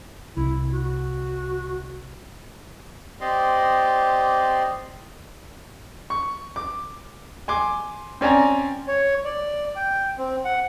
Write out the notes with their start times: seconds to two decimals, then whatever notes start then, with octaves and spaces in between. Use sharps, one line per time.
0.37 C2 E4
0.72 F#4
3.21 C4 G4 D5 D#5 C6
6.10 C#6
6.56 D6
7.48 G#5 C6 D6
8.21 C4 C#4 D5 G#5 A#5
8.88 C#5
9.25 D5
9.76 G5
10.18 C4
10.45 F#5